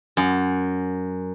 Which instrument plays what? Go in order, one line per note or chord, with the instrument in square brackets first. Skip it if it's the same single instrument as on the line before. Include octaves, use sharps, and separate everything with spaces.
[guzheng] F#2